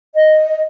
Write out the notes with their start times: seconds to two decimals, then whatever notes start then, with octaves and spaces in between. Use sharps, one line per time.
0.15 D#5